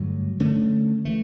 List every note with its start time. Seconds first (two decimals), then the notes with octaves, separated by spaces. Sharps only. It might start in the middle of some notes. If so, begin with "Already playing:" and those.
Already playing: G2 D3 F#3 A3
0.40 D3 A3 C#4
1.05 E3 A3